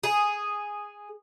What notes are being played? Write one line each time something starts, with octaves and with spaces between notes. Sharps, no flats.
G#4